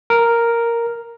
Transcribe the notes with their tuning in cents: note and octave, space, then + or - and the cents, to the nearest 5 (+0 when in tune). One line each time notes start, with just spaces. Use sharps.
A#4 +0